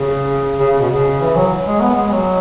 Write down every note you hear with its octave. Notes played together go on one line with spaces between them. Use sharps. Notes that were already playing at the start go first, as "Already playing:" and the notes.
Already playing: C#3
C#3
C#3
B2
C#3
E3
F#3
G#3
B3
G#3
F#3